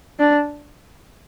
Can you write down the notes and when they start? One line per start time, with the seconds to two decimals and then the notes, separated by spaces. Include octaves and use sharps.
0.19 D4